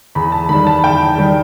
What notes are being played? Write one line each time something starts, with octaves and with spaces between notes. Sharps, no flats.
E2 B5
A5
D#3 G3 B5
A5
E2 G5
D#3 G3